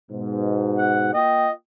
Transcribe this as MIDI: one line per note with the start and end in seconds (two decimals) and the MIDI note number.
0.11 1.11 44
0.11 1.11 47
0.77 1.13 78
1.13 1.48 58
1.13 1.48 65
1.13 1.52 75
1.13 1.48 79